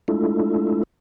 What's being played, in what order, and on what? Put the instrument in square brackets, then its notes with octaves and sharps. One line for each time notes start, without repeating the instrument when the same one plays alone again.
[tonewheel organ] G#3 A3 D4 E4 F4 A4